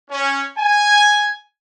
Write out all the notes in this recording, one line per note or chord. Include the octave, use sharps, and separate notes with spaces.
C#4
G#5